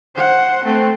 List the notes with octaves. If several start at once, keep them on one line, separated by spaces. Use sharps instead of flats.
C5 F#5
A3 C4